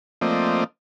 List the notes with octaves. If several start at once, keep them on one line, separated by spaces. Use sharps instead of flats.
F3 A3 A#3 C4 D5 D#5